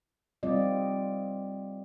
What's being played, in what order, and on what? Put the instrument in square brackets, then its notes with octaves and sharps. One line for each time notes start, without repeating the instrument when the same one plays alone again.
[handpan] G3 C4 F4 D5 D#5